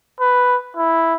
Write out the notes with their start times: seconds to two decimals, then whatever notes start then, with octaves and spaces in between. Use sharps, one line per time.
0.20 B4
0.76 E4